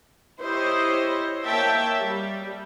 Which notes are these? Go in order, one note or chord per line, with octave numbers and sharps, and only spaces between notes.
E4 G4 C5 C#5 D#5
A#3 C#5 E5 G5 A5
G3